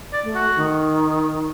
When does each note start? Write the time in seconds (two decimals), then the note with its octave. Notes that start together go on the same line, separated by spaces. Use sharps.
0.13 D5
0.24 A3
0.35 F#4
0.56 D#3